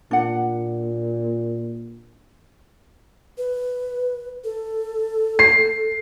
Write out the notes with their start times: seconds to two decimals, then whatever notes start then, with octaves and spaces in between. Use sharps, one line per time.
0.11 A#2 D4 F#5
3.38 B4
4.44 A4
5.39 C7